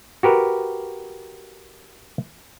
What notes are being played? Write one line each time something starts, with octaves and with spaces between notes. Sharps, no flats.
F#4 G4 A#4 B4